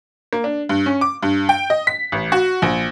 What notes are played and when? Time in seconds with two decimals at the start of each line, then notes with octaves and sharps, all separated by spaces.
0.33 A#3
0.44 D4
0.69 G2
0.86 C#4
1.01 D6
1.22 G2
1.49 G5
1.70 D#5
1.87 B6
2.12 A1
2.32 F#4
2.62 A#1